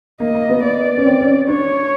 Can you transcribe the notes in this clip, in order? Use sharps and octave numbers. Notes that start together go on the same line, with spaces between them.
A#3 D#5
A#3
B3
D5
C#4
C4
C#4
D4 C#5